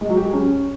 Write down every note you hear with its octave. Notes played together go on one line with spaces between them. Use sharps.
G#3
F#3
G4
G#4
C#4